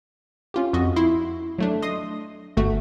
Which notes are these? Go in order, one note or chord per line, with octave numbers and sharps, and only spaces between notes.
C#4 F4 G4
F2 F#4 D#5
E4 C6
F#3 A3 D4
D#5 C6 D#6
G1 A3 F#4